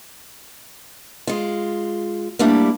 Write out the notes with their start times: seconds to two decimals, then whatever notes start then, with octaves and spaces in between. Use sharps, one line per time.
1.27 G#3 F4
2.39 G3 A3 A#3 D4 E4